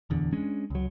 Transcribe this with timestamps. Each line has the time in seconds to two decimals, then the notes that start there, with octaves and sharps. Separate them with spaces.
0.10 D1 E2 D3
0.33 G#3 C#4 D4
0.70 C#2 F#3